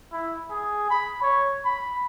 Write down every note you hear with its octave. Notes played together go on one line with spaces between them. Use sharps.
E4
G#4
B5
C#5
B5